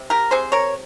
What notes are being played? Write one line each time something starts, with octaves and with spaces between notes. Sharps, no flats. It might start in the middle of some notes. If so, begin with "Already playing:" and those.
Already playing: C3
G4 A#4
C3 G#4 C5
A#4 C#5